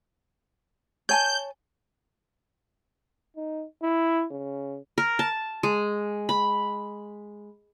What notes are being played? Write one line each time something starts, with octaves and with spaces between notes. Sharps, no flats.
C#5 G#5 A5 G6
D#4
E4
C#3
A#4
A5
G#3
B5